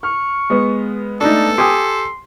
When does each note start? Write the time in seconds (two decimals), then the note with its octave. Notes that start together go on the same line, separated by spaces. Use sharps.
0.03 C#6 F6
0.50 G#3 B3
1.21 A3 D4 D#4 A4
1.58 G4 G#5 C6 D#6